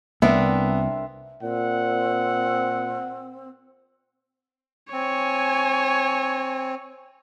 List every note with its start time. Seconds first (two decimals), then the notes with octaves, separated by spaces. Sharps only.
0.22 C2 B3 C4 D4 A#4 E5
1.42 A#2 C4 F#5
4.93 C4 C#5 G#5